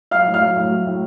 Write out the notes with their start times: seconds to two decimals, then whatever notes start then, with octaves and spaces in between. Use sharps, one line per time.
0.11 F#3 F5 F6
0.26 A2
0.34 F5 F6
0.42 F#3
0.56 A2
0.70 F#3
0.86 A2